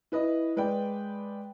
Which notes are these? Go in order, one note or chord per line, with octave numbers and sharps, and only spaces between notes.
E4 B4 D#5
G#3 B4 D5 G5